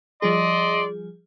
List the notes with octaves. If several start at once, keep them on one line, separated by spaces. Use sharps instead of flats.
F3 G3 G#4 D5 D#5 C6